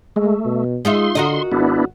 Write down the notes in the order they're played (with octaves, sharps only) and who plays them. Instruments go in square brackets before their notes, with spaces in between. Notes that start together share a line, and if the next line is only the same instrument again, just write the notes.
[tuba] G#3 [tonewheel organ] A3
[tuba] B2
[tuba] G#3 [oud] D#4 F4 E5 [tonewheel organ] C6
[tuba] D3 [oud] F#4 A#4 D#5
[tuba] G#1 [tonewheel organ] B3 D4 E4